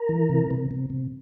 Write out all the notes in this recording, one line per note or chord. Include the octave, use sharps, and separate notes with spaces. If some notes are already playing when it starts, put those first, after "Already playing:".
Already playing: A#4
E3
C3
C3
C3
C3